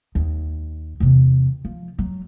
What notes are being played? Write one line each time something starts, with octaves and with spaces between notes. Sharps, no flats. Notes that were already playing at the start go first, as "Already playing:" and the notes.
D#2
E2 C3
F3
F#3